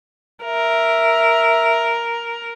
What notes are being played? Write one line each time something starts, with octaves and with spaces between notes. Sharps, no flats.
A#4 E5